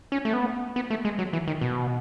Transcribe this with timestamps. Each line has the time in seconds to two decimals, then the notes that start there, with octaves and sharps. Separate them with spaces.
0.12 C#4
0.25 A3
0.33 B3
0.76 B3
0.90 A3
1.05 G#3
1.19 F#3
1.33 E3
1.48 D#3
1.61 B2